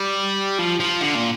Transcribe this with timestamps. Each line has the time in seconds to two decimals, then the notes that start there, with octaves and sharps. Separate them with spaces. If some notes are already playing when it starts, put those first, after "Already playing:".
Already playing: G3
0.59 F3
0.80 F3
1.01 D3
1.15 A#2